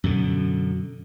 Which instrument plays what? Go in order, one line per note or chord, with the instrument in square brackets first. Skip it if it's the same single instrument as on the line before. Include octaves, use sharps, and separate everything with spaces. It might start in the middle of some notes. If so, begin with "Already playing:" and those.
[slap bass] F#2 B2 D3